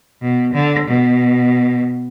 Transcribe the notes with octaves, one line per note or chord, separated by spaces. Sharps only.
B2
D3
B2